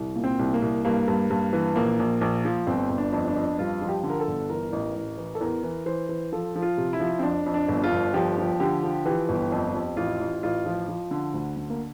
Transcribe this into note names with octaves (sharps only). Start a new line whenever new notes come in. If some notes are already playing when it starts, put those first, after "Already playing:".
Already playing: C2
A#2
C4
C2
A#3
C2
G2 A#3
G2
G2
E3
A#1 A#3
A#1
A#1
F3
G1 C4
G1
D4
F2
D4
F2
G2 F4
F3
G4
D3
A#4
A4
G1
E3 A#4
A1
A1
E3
A4
E2 A#4
E3
E3 C5
E3
F3 A4
F3
F4
C3
E4
F3
C4
F2 D4
F2
D4
G1
F4
G1
F3 G4
F3
D3 G4
F3
E3 G4
G1
F2
F2
A1 F4
A1
A1 F4
F3
F3
D3
D2
D3
A#3